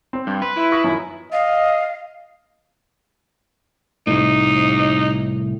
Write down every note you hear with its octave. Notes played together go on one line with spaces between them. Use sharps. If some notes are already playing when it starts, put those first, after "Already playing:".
C4 C5
G2
B4 C6
E4
C#6 D#6 A#6
F#2 D#3 F3
D#5 F5
C2 A2 D#4